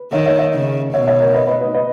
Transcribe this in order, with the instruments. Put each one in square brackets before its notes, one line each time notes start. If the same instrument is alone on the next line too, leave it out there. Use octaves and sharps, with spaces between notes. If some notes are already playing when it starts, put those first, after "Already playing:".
Already playing: [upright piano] B4
[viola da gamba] D#3 [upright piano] C#5 E5
[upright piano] C#5 E5
C#5 E5
[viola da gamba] C#3
[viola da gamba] B2 [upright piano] C#5 E5
[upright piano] C#5 E5
A#4 C#5
B4 D#5
B4 D#5
B4 D#5
B4 D#5